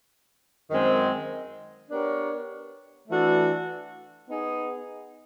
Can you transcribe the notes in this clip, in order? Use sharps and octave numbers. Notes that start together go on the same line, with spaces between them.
F#2 D#3 G#3 C4
B3 D4 G4 A#4 C#5
E3 A3 D4 F#4 A4
B3 D#4 G#4